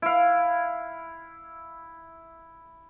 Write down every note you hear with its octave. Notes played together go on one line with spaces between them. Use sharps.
E4 F5